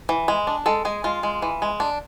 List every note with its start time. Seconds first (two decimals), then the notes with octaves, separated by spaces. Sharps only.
0.09 E3
0.28 G#3
0.47 D4
0.66 G#3 A4
0.85 G#3 G#4
1.04 G#3 F4
1.23 G#3
1.42 E3
1.62 G#3
1.80 D4